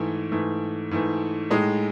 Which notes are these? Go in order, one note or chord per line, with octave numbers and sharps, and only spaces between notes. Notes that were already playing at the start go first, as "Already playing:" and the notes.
Already playing: G#2 E3 A3
G#2 E3 A3
G#2 E3 A3
A2 G#3 D#4